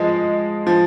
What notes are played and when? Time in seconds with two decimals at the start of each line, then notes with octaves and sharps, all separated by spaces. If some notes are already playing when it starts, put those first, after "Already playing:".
Already playing: F3 G#3
0.67 F3